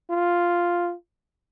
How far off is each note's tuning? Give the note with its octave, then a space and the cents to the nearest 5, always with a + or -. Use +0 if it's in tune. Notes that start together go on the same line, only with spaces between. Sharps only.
F4 +0